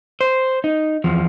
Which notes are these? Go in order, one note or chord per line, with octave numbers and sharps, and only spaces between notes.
C5
D#4
E2 F3